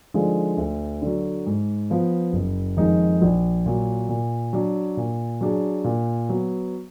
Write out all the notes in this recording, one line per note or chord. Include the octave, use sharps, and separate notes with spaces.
D3 F3 G#3 D#4
D2
D3 F#3
G#2
F3 B3
F#1
F2 D#3 G#3 D#4
A#1
A#2 F#3
A#2
F#3 D4
A#2
F#3 D4 G#4
A#2
F#3 B3